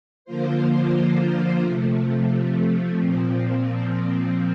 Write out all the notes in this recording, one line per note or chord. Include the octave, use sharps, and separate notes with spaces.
D3 F3 A#3 F4 C5
C3 F3 A3
A#2 F3 C4